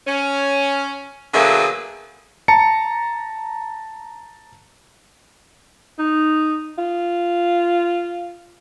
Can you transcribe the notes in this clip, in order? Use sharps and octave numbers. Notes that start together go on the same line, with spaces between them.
C#4
B2 D3 F#3 A#3 G#4 E5
A5 A#5 C#7
D#4
F4